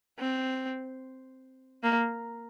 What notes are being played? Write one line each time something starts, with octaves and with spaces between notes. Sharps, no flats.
C4
A#3